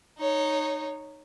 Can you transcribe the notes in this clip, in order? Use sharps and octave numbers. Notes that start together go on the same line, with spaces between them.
D#4 C#5